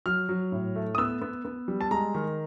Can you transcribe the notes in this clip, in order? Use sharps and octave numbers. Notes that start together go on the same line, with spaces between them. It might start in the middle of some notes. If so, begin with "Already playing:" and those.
F#3 F6
F#3
A2
A3
D#6
B3 E6
B3
B3
G3
A5
G#3 A#5
D#3